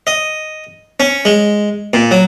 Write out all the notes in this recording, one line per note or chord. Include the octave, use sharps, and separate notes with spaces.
D#5
C#4
G#3
A#2
F#3